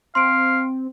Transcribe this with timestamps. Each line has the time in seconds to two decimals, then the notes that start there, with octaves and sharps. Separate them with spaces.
0.15 C4 F5 C6 D7